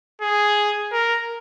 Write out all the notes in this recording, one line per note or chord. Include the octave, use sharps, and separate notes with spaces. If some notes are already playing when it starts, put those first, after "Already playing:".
G#4
A#4